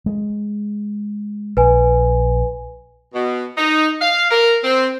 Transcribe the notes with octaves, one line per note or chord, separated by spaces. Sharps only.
G#3
A#1 B4 G#5
B2
D#4
F5
A#4
C4